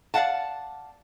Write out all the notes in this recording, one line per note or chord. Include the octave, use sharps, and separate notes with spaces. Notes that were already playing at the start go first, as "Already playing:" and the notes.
D5 D#5 F5 F#5 A5